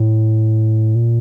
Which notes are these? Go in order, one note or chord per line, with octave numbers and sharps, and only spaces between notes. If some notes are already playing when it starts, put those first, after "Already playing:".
Already playing: A2
A#2